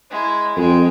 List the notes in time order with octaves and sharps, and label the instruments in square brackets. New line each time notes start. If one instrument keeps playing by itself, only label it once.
[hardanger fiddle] G#3 E4
[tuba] F2 [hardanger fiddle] G#3 G5